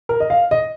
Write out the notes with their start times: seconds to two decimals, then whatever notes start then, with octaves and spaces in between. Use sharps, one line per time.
0.09 A#4
0.20 D#5
0.30 F5
0.51 D#5